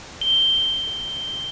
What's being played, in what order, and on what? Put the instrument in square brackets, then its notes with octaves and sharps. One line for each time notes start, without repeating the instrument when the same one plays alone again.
[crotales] G7